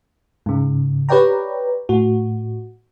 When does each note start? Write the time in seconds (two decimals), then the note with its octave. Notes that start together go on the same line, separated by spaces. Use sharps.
0.46 G#2 C#3
1.09 G4 B4 C#5 D5 G5 A#5
1.89 A2 F#4